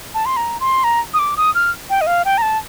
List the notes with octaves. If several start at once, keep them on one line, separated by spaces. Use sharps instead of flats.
A5
C6
A#5
C6
A#5
D#6
D6
D#6
F6
G5
D#5
F5
G5
A#5
A5